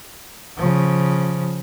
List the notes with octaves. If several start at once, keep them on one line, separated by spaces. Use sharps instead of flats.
C#3 F3